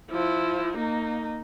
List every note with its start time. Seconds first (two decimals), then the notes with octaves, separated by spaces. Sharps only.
0.11 F3 E4
0.77 A#3 D#4